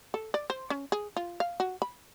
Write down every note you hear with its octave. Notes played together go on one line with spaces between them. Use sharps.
A4
D5
C5
C#4
G#4
F4
F5
F#4
B5